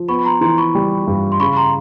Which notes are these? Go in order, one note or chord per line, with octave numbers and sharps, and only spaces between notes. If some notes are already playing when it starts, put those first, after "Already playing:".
Already playing: F3
B3 B5 C#6
B5
A#5 C6
E3 A#5 C6
B5 C#6
G3
G2
C6
C#3 B5 C#6
A#5 C6